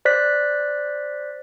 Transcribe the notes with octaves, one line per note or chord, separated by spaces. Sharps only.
C5 D5 F#6 B6